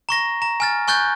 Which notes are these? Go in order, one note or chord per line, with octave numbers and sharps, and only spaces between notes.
A#5 C#6 A#6
A#5
G#5 F6 A6
G#5 C#6 F#6 G6 A6